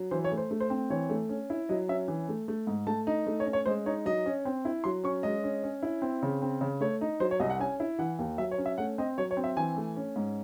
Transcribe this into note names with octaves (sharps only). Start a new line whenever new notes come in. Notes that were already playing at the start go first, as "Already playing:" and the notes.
Already playing: F#3
E3 C5
C#5
A3
C5
A3
C5
C4
E3 C#5
A3
C#4
E4
F#3 D#5
C#4 E5
E3
A3
A3
G#2
A3 A5
D#4
A3
C#5
C#4
C#5
G#3 C5
D#4 C#5
F#3 D#5
C#4
C4
E4
F#3 C6
C#4 C#6
G#3 D#5
C#4
C#4
E4
C4
C#3
C4
C#3
A3 C#5
D#4
F#3 C5
C#5
C2 D#5
F#5
C#4 G#5
E4
E3 F#5
D#2
F#3 E5
C#5
C#4
E5
A3 F#5
C4 D#5
F#3 C#5
C#5
C4
E5
E3 G#5
A3
C#4
G#2